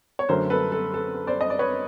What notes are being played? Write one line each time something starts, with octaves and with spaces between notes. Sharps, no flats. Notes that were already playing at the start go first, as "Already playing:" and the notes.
C#5
F#2 D3 F#3 A3 A#4 C5
A4 B4
A4
A4
C5 D5
D#5
D5
B4 C#5